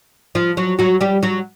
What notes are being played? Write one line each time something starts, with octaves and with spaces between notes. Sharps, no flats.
F3 F4
F#3 F#4
F#3 F#4
G3 G4
F#3 F#4